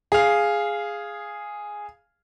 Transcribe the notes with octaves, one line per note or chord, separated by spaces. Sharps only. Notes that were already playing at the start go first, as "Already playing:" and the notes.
G#4 F5